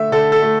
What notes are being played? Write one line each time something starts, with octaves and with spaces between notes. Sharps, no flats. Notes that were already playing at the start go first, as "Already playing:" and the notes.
Already playing: D3 A3 E5
D3 A4
A4
A3